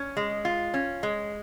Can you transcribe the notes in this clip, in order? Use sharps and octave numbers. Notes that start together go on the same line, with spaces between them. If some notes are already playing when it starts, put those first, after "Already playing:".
Already playing: C#4
G#3
F4
C#4
G#3